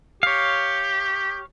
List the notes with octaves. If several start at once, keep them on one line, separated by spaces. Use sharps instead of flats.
G4 C#5 F5